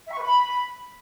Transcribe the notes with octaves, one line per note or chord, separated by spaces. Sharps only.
E5
C#6
B4
B5